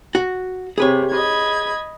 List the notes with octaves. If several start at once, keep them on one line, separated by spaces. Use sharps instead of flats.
F#4
C3 G#4 B4 C#5
D#5 B5 G#6